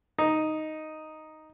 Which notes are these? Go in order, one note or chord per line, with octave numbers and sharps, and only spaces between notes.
D#4